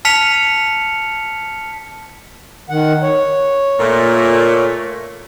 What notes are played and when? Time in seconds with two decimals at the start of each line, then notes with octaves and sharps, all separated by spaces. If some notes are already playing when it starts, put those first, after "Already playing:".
0.05 A5 F6 B6 C#7 F7
2.70 D#3 F#5
3.03 C#5
3.80 A#2 A3